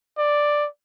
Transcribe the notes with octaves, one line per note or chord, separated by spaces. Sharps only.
D5